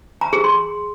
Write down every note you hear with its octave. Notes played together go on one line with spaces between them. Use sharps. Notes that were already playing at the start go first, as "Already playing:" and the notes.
A#5
G#4
C6